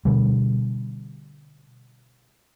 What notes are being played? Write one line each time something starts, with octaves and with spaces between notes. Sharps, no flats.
B2 D3 G3